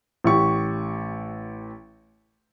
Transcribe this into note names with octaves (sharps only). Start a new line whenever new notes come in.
A1 G4 C#6